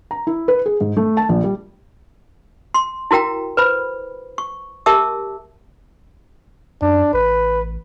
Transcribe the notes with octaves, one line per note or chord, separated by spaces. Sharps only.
A#5
E4
B4
G#4
G#2
A3
A5
A#1
G3
C6
E4 F#4 A#4 G5 A#5
B4 C5 B5
C#6
G4 A#4 E5 A5 D6 E6
F#2 D4
A1 B4